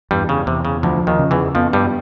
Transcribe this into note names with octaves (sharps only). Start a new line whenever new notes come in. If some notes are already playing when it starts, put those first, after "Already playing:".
E2 G2 G3
C#3
E2 C3
C#3
D2 D3 F3
D#2 D#3
C#3
E2 E3
F2 F3 B3
G2 G3